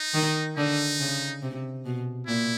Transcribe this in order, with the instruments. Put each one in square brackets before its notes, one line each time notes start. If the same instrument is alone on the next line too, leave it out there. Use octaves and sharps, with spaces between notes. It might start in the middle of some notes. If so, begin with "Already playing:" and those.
Already playing: [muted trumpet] D#4
[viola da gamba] D#3
[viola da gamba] D3 [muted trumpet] D#4
[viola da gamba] C#3
C3
B2
[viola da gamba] A#2 [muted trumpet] E4